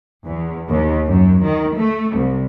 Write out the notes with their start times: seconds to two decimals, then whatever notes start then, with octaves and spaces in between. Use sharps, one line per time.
0.24 E2
0.68 D#2
1.08 F#2
1.44 D#3
1.77 A3
2.16 C2